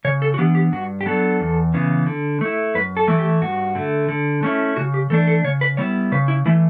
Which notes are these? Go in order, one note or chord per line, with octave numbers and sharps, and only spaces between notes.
C#3 C#5
A4
F#4
E3 B3 D4 G4
G4
G2 F#4
G4
F#3 B3 D4 A4
E2
C#3 E3 B3
D3
A3 E4
F#2 B4
A4
E3 A3 E4
G4
G2 F#4
D3 A3
D3
A3 C#4 E4
C#3 F#4
G4
E3 A3 D4 A4
A4
C#3 C#5
B4
G3 B3 E4 C#5
C#3 B4
E4
E3 A3 E4